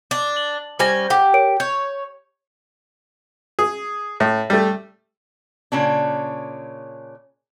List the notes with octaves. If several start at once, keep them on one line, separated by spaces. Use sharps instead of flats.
D4
F#7
G3 C#4 C5 G#5 A#6
G4 F#5 G5 D6
A#4 C#5 D7
C#5 G6
G#4
A2
G3 A3
A#2 C#3 C#4 D4